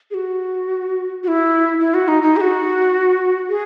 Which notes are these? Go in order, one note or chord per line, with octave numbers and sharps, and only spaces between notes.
G#4
F#4
F#4
E4
E4
F#4
D#4
D#4
G#4
F#4
G#4